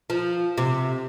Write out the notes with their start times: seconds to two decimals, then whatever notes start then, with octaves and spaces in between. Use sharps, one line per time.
0.10 F3
0.58 C3